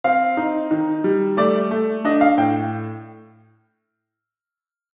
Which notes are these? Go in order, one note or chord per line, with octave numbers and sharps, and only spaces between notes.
C4 F5
D#4
D#3
G3
A3 D5
A3
D4 D#5
F5
A2 G5